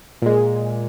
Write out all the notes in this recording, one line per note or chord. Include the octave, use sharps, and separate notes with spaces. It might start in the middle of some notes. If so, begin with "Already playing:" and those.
A#2 G#3